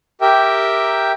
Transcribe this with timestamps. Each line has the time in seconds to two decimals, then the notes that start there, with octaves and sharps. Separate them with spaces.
0.21 G4 A#4 E5 G5